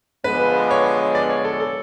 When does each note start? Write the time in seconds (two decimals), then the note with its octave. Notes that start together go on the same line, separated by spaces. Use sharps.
0.24 D3 F3 G#3 B3 B4
0.71 C#5
1.15 D5
1.30 C#5
1.44 A4
1.60 A4